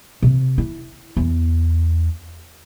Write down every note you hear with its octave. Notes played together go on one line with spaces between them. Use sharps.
C3
E4
E2